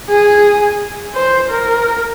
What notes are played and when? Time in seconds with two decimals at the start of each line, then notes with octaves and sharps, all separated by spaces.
0.10 G#4
1.15 C5
1.50 A#4